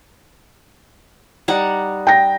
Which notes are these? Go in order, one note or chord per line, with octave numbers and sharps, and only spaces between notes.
G3 D#4 F#5
G5 A#6